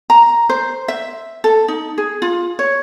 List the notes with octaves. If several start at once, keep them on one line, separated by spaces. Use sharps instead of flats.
A#5
C5
E5
A4
D#4
G#4
F4
C#5